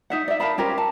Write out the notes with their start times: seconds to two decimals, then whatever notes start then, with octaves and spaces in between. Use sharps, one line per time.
0.10 D#4 E5 F#5
0.28 D5 E5
0.40 A#4 F5 A5 B5
0.58 C#4 G4 A#4 C5
0.78 A5